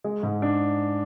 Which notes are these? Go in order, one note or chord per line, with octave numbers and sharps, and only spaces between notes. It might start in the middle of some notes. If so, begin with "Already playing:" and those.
G#3
G#2
D4